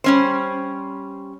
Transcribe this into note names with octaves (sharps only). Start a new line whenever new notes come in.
G3 C#4 C5